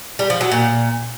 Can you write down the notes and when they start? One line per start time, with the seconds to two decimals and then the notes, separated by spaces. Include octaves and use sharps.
0.19 G3
0.30 F3
0.41 F#3
0.51 A#2